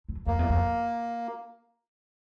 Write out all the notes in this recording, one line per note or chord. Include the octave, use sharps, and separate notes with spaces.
F2
F2 A#3
E2
F2